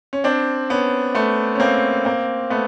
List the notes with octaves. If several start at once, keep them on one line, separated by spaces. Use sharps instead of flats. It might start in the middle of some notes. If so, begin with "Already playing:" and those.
C#4
C4 D4
B3 C#4
A3 B3
C#4
A#3 C4
A#3 C4
A3 B3